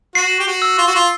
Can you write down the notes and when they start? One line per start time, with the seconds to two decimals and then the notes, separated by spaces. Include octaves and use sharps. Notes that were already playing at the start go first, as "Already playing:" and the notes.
0.15 F#4 C7
0.39 G4
0.47 F#4
0.62 E6
0.78 F4
0.87 F#4
0.95 F4